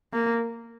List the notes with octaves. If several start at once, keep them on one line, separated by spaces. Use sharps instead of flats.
A#3